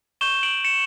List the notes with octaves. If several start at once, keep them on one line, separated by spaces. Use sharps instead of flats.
C#6 G6 E7 G7
D7 F#7
C#7 E7